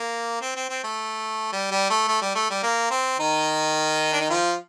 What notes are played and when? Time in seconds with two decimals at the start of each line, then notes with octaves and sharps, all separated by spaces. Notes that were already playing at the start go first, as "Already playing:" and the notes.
Already playing: A#3
0.41 C4
0.55 C4
0.69 C4
0.84 A3
1.53 G3
1.71 G3
1.90 A3
2.08 A3
2.22 G3
2.35 A3
2.50 G3
2.63 A#3
2.91 C4
3.19 D#3 D#4
4.13 D4
4.21 D#4
4.30 F3 F4